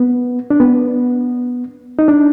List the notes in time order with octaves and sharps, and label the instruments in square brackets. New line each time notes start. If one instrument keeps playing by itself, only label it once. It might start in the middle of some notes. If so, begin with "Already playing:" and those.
Already playing: [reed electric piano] B3
D4
B3
D#4
D4